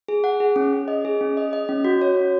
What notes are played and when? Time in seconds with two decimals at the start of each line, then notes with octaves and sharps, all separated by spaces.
0.08 G#4
0.24 F#5
0.40 G#4
0.56 C#4
0.73 C#4
0.88 D#5
1.05 G#4
1.21 C#4
1.37 D#5
1.53 D#5
1.69 C#4
1.85 F#4
2.01 C#5
2.17 F#4